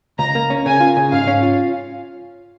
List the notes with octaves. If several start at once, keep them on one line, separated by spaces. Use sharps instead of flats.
C#2 A#5
A#3
C#4
C#3 G#5
F4
C#3
G#2 F5
C#4
F4